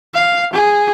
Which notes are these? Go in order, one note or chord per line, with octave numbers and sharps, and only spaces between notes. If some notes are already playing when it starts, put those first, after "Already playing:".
F5
G#4